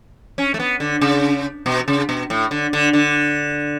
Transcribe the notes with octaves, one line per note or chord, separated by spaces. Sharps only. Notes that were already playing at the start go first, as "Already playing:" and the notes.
C#4
A3
B3
D3
C#3
B2
C#3
B2
A2
D3
D3
D3